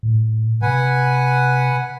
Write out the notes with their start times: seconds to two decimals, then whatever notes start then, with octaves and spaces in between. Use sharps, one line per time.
0.03 A2
0.62 C3 B4 F#5 G#5